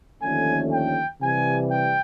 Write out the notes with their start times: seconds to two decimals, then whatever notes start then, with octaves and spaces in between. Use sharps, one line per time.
0.22 D#2 D3 F3 A3 C#4 G#5
0.71 G5
1.20 C3 E3 G3 G#5
1.70 G5